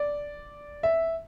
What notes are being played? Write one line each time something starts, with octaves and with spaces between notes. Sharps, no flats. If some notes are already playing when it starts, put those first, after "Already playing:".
Already playing: D5
E5